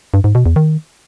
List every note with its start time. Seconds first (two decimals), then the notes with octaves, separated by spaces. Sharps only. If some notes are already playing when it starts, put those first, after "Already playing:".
0.14 G2
0.24 G#2
0.35 B2
0.46 E2
0.56 D#3